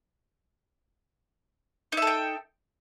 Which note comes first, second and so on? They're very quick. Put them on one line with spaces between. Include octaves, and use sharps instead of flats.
D#4 E5 A4 G5